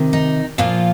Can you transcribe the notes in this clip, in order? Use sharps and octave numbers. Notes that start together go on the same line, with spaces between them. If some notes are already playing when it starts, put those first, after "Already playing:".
Already playing: C3 D#3
D#4
A#2 F3 F4